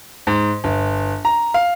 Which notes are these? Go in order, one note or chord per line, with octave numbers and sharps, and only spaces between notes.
G#2
G1
A#5
F5